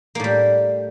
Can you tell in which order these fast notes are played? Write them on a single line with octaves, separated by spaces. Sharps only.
A#3 A2 G3